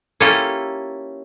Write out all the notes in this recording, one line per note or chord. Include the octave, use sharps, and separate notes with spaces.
A#3 C#4 E4 F4 G4 A4